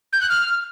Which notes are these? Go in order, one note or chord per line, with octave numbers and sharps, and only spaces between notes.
G6
F#6
F6